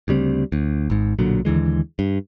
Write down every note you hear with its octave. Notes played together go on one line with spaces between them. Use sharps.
D2 C#3 G3 C4
D2
G#1 G#2
B1 A#2 D3 F#3
D#2 D3 E3 G#3
G2